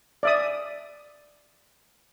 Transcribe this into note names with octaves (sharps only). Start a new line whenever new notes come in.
D5 E5 D#6